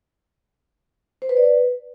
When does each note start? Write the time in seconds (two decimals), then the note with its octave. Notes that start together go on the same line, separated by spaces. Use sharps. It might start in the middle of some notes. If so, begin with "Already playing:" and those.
1.22 C5
1.29 B4
1.37 D5
1.44 B4